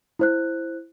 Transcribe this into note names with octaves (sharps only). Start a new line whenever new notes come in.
E4 C5 F#6